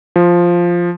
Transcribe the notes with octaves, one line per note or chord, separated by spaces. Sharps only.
F3